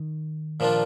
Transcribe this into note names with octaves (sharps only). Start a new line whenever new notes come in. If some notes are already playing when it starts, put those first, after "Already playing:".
Already playing: D#3
A#2 F3 A#3 D4 F4